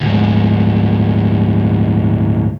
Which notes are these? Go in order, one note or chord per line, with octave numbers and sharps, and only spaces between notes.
D2 G#2